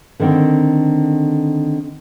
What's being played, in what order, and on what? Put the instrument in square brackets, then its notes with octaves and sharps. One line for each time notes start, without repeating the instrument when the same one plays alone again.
[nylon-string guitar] D3 D#3 C4